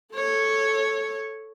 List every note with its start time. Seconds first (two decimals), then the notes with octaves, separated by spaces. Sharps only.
0.14 A4 C#5